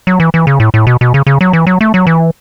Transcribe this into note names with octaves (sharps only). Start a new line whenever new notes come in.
F#3
E3
E3
C#3
A2
A2
B2
B2
C#3
C#3
F#3
E3
F#3
A3
F#3
E3